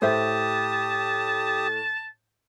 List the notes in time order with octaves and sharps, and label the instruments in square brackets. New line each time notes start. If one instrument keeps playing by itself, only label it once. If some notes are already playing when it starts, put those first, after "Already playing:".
[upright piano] A2 [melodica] G4 D#6 [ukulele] C5 E5 [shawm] A5